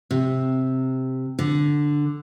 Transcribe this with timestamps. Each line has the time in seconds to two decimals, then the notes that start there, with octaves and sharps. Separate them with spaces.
0.11 C3
1.39 D3